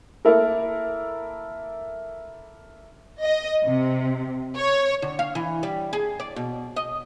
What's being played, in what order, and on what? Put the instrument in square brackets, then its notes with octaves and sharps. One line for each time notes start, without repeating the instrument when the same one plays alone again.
[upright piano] A#3 E4 A4 A#4
[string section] D#5
C3
C#5
[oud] D3
F5
E3
G3
G#4
D5
B2
D#5